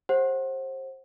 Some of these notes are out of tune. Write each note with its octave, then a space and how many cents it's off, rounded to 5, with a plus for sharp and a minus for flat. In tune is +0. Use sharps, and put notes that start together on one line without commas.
G4 +25 C5 +25 F#5 +0